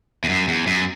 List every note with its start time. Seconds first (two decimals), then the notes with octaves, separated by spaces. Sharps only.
0.24 E2
0.29 F#2
0.48 E2
0.67 F#2